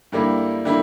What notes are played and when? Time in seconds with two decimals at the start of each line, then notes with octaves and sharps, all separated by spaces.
0.12 G2 D3 G3 A#3 E4
0.65 D3 G3 A#3 E4